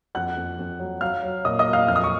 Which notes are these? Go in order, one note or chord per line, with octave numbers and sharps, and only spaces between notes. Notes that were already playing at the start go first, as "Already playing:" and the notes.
F2 F#5 F#6
F2
F2
F#3
F#3 F5 F6
F#3
A#2 D#5 D#6
D#5 D#6
F#3
F5 F6
F2 F6
D#6
C#6